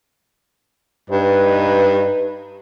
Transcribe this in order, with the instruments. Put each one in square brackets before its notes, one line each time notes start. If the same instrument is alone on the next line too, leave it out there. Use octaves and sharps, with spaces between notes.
[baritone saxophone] G2 [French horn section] D#4 B4